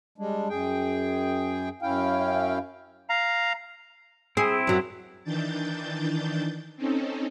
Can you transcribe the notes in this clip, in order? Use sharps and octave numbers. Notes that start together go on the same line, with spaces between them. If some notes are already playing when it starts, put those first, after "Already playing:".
G3 G#3 D4
F#2 G#4 G5
F#2 C#4 E4 F5 G5
F5 A#5
C4 E4 G#4
F#2 F#3
D#3 E3 D4 G6 A6
C4 C#4 D#4 A4